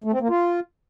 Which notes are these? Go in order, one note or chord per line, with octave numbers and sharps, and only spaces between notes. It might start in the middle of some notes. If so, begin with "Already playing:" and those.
A3
C4
A#3
F4